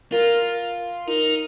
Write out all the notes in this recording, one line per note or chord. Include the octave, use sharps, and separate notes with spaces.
F4 A#4
D#4 A#4